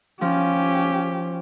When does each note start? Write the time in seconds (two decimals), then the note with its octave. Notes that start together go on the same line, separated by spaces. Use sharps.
0.21 F3 C#4 G4